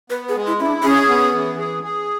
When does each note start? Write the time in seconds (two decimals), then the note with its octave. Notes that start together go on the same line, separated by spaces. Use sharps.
0.10 B3 B4
0.29 G#4
0.35 G#3
0.47 E4
0.60 C#4 E4
0.66 D4
0.84 C#4 G#4
1.09 B3
1.33 E3
1.58 G#4
1.83 G#4